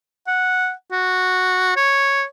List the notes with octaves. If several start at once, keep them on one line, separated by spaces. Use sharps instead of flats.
F#5
F#4
C#5